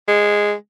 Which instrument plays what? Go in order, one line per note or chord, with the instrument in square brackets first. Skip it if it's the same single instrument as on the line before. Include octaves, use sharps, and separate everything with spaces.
[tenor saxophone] G#3